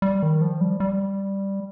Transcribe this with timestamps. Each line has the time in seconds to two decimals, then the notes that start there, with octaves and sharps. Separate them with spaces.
0.02 G3
0.23 D#3
0.41 F3
0.61 G3
0.80 G3